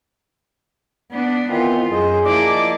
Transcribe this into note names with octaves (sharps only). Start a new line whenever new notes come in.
B3 D4
D#3 E3 B3 C4 F4
F#2 G#4 C5 D#5
F3 A#3 E4 D5 D#5 D6